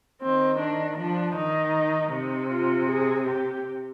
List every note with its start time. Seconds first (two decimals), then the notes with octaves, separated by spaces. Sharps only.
0.21 D#3 C4
0.60 D4
0.98 F3 D4
1.36 D#3 D#4
2.12 C3 D#4
2.51 F4
2.89 G#4
3.27 G4